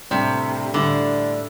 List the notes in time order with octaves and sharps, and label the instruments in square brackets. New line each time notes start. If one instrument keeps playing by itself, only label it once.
[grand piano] A2 G3 D4 [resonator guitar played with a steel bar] C3
[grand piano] A2 G3 D4 [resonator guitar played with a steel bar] D3